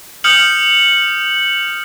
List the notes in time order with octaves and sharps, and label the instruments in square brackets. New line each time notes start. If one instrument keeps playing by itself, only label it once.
[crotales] D#6 F6 G6 C#7 F#7